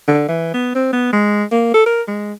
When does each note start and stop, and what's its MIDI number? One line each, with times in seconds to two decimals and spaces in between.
0.08 0.26 50
0.29 0.53 52
0.54 0.72 59
0.75 0.88 60
0.93 1.11 59
1.13 1.44 56
1.52 1.71 58
1.74 1.84 69
1.86 2.02 70
2.08 2.33 56